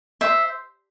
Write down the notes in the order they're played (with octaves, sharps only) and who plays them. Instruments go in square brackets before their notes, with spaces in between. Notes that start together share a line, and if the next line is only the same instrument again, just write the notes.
[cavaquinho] C5 E5